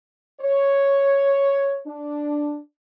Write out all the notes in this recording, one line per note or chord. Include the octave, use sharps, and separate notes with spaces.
C#5
D4